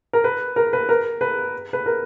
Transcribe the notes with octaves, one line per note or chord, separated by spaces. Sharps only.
A#4
B4
A#4
B4
A#4
B4
B4
A#4